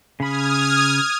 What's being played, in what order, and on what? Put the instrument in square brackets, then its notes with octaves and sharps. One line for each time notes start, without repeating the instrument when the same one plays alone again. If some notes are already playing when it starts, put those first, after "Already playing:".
[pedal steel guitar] C#3 B5 [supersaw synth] D#6 F6 G#6